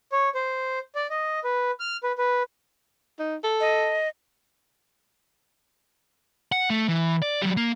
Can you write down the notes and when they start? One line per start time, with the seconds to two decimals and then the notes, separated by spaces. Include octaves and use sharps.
0.12 C#5
0.35 C5
0.95 D5
1.10 D#5
1.44 B4
1.80 F6
2.03 B4
2.18 B4
3.19 D#4
3.43 A4
3.60 D#5
6.52 F#5
6.70 A3
6.88 E3
7.22 D5
7.42 F#3 G3
7.57 A#3